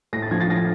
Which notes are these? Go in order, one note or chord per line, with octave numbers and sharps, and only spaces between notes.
A2 A#6
A6
F3 G#6
A6
A2 A#6